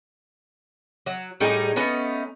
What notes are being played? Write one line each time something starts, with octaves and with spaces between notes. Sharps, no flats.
F#3
A2 G3 D#4 G#4
A3 B3 C#4 D#4